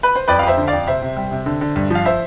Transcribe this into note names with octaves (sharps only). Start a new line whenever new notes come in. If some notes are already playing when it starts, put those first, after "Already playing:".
B4
C5
F2 B4 D5
F5
F2 C5 E5
D3
F2 D5 F5
C3 C5 E5
C3
G3
C3
D3
D3
G2
F3 F5
C5 E5